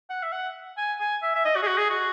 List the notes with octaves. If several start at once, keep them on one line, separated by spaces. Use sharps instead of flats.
F#5
E5
F#5
G#5
G#5
E5
E5
D#5
F#4
G#4
F#4
G#4
F#4